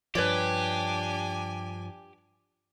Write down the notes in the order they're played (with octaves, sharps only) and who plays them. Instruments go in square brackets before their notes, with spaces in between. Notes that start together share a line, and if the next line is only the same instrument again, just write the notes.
[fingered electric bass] G2 F3 [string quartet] D4 G#5 [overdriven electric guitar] G4 [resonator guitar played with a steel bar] B4 C#5 D5